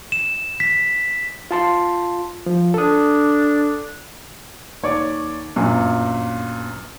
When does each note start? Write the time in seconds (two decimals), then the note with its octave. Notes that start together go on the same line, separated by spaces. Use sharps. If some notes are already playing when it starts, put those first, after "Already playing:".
0.12 E7
0.60 B6
1.51 F4 A5 C6
2.46 F3
2.74 D4 A4 D#6
4.83 D#2 C#5 D5 D6
5.56 G1 F#2 A#2